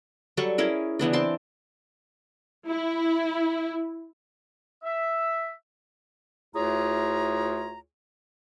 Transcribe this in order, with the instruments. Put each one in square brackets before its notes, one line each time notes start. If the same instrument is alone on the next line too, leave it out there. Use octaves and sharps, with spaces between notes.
[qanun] F#3 G3 A4 C#6
C#4 E4 G#4 A#4
C#3 E3 B3 D4
C4 A5 C6 D6
[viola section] E4
[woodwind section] E5
D2 E4 F4 G#4 C#5 A#5